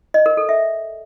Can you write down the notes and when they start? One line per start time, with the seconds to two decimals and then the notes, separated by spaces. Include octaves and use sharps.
0.14 D#5
0.26 A#4
0.37 A4
0.49 E5